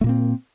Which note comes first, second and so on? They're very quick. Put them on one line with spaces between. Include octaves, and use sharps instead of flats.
A3 A#2 A#3 C4